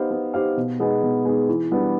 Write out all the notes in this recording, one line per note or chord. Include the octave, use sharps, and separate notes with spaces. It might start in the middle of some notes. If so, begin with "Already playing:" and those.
Already playing: B3 D#4 G4 C5 F5
B3
D#4 G4 C5 F5
B2
G#3 B3 D#4 G#4
B2
G#3 B3 D#4 G#4
E3
G3 B3 D4